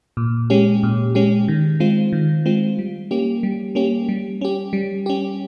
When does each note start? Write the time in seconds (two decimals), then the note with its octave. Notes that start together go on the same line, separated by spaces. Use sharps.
0.17 A#2
0.50 G#3 C#4 G4
0.83 A#2
1.15 G#3 C#4 G4
1.48 D#3
1.80 G#3 C4 F4
2.13 D#3
2.46 G#3 C4 F4
2.79 G3
3.11 A#3 C#4 G4
3.43 G3
3.75 A#3 C#4 G4
4.09 G3
4.41 C#4 G4
4.73 G3
5.06 C#4 G4